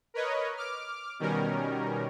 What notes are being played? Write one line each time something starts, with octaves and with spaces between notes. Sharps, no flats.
A#4 B4 C#5 D#5
D6 F6
B2 D#3 G3 C#4 A#4